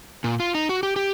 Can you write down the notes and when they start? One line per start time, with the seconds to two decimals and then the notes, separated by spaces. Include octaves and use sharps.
0.24 A#2
0.40 F4
0.55 D#4
0.69 F#4
0.83 G4
0.96 G4